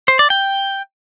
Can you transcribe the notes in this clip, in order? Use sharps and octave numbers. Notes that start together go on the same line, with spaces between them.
C5
D5
G5